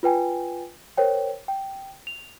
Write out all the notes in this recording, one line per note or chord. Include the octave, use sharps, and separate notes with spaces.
F4 B4 G5 G#5
A#4 C5 C#5 G5
G5
F7